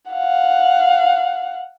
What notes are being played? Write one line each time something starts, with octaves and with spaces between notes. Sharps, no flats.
F5 F#5